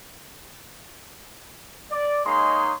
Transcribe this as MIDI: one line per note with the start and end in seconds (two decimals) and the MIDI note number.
1.91 2.23 74
2.25 2.72 56
2.25 2.72 58
2.25 2.72 63
2.25 2.72 68
2.25 2.72 73
2.25 2.72 84